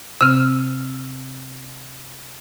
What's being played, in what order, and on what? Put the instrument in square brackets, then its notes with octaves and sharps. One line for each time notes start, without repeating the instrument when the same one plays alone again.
[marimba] C3 C4 [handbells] E6 F6